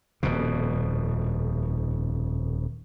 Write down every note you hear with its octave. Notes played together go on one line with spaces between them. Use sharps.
D#1 F2 B2